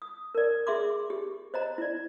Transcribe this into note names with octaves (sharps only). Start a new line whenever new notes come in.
D#6
A#4 D5
G#4 E5 C6 D6
G4
C5 D#5 A#5
E4 D5